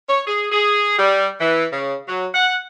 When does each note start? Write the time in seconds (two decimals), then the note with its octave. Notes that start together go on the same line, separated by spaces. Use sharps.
0.09 C#5
0.27 G#4
0.51 G#4
0.99 G3
1.40 E3
1.72 C#3
2.08 F#3
2.35 F#5